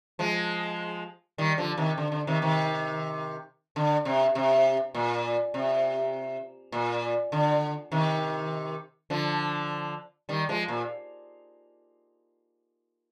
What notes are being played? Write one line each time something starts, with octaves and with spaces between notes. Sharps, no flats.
F3 G#3
D#3 G3
D3 F3
C3 D#3
D3
D3
C3 D#3
C3 D#3
D3
C3
C3
A#2
C3
A#2
D3
C3 D#3
D3 F3
D#3 G3
F3 G#3
A#2